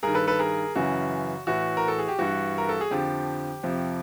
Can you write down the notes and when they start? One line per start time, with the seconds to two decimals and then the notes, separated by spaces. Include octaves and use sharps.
0.03 G2 D#3 G#4 A#4
0.15 A4 B4
0.27 A4 B4
0.39 G#4 A#4
0.76 F#2 C#3 E3 F#4
1.47 A2 E3 F#4
1.77 A#4
1.88 A4
1.99 G#4
2.08 G4
2.19 G2 E3 F#4
2.58 A#4
2.69 A4
2.81 G#4
2.91 F2 D3 F3 G4
3.63 F2 C3 F3